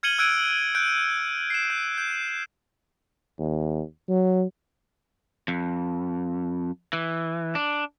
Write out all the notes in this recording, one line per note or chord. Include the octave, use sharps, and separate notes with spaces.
F6 G#6 C#7 D#7 F#7 G7
E6 F#6 G#6 D7 D#7
F#6 G6 D7
C7 E7
G6
G6
D#2
F#3
F2
E3
D4